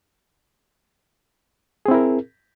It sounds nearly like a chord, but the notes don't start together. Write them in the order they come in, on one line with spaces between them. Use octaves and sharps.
G#4 C4 E4 A#4